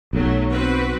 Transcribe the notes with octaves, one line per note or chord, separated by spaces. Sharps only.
B1 F#3 A3
C4 F#4 B4